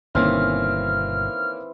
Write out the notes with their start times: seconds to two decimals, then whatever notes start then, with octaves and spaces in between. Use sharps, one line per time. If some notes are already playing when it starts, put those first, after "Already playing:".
0.15 G1 B2 D#3 E3 A#3 C4 C#4 F6